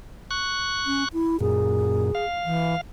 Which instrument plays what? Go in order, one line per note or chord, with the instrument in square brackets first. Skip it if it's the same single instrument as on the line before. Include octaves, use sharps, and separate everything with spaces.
[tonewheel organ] C#6 F#6
[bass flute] C#4
E4
[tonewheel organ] F#2 A#2 [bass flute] G#4
[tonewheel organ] F5
[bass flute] E3